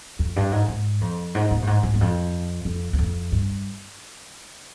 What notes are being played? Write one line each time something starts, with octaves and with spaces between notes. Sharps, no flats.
F2
G2
G#2
G#2
F2
G#2
A#2
G2
G#2
G#2
E2
F2
F2
E2
F2
G2